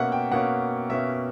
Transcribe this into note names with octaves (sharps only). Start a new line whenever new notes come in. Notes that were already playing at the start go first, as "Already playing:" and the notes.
Already playing: B2 A#3 C#4 E5 F#5
G5
B2 A#3 C#4 F#5
B2 A#3 C#4 E5